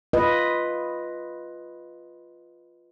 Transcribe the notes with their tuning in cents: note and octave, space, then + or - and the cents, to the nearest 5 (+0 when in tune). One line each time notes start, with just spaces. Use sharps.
F4 +0 B4 +0 D#5 +0